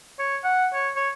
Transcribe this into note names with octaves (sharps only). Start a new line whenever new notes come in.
C#5
F#5
C#5
C#5